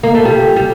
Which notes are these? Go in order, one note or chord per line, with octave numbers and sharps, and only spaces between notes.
A#3
A3
G3
G3